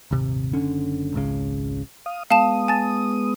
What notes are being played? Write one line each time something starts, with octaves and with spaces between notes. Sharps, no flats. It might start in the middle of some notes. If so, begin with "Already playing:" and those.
D#1 G#1 C3
F#1 D3 C#4
G#1 C#2 C#3
F5 D#6
G#3 B3 F5 A5 D#6 E7
G#5 A5 A6